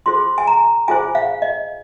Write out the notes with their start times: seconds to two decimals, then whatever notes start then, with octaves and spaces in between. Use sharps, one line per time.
0.06 F4 G#4 C5 C6
0.38 G#5
0.47 A#5
0.88 F4 G#4 C5 G#5
1.15 F5
1.42 D#5